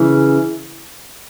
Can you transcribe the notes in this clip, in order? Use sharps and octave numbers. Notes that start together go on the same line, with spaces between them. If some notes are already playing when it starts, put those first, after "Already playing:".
Already playing: C#3 E3